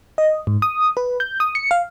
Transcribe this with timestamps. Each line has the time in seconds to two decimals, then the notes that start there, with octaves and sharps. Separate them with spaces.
0.18 D#5
0.47 G#2
0.62 D#6
0.97 B4
1.20 G6
1.40 D#6
1.55 C#7
1.71 F5